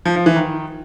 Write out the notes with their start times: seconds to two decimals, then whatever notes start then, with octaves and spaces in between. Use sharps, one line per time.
0.05 F3
0.16 F3
0.26 E3
0.36 D#3